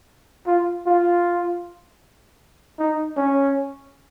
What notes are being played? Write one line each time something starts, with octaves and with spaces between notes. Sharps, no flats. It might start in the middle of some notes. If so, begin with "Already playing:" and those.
F4
F4
D#4
C#4